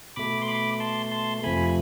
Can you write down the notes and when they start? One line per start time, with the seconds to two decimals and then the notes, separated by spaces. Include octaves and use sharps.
0.16 B2 A3 B5 D6
0.42 C6
0.48 B5 D6
0.80 A5 C6
1.11 A5 C6
1.43 F2 C3 F3 A3 G#5 B5